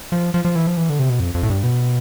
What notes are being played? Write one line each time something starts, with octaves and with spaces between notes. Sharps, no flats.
F3
F3
F3
E3
F3
E3
D3
C3
B2
F2
F2
A2
G2
B2